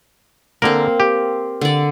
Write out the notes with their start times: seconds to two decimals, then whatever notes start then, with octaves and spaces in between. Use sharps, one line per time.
0.62 D3 A#3 C4 A#4
1.00 G4
1.61 D3 D5